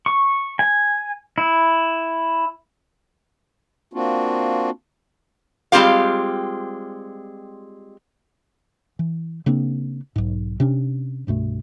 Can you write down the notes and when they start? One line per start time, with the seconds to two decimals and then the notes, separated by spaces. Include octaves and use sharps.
0.06 C#6
0.59 G#5
1.38 E4
3.93 A#3 C4 D4 F4 F#4
5.72 G3 G#3 C4 F4 G4 F5
8.99 E3
9.46 C#3 A#3 C4 D4
10.16 B1 G#2
10.60 C3 C#4 D4
11.27 C2 G2 B2 A3